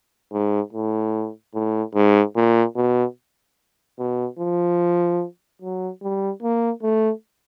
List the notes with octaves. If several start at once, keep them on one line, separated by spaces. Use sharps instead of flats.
G#2
A2
A2
G#2
A#2
B2
B2
F3
F#3
G3
A#3
A3